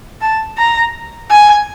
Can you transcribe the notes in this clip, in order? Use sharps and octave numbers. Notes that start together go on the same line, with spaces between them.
A5
A#5
G#5